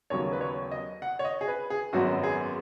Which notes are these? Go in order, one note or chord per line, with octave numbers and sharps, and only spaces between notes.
D#2 C#3 F#3 B3 C#5
B4
C#5
D#5
F#5
C#5
D#5
G#4
B4
G#4
G#1 F#2 F#3 B3 F#4
G#4